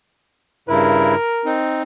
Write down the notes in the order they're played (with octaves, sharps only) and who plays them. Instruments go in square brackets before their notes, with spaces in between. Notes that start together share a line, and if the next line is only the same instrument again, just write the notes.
[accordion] G2 C#3 E4 [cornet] A#4
[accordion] C4 D#4